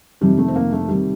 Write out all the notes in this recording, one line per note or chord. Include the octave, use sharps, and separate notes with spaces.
F2 C3 D#3 G3
A3
C4
A#3
A3
C3 D#3 G3